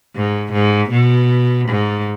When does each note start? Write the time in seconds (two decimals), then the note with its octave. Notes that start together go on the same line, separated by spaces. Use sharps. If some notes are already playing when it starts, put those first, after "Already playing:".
0.15 G#2
0.53 G#2
0.91 B2
1.69 G#2